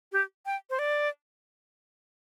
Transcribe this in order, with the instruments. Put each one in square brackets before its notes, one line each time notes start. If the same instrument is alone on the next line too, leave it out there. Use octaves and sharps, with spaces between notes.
[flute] G4
G5
C5
D5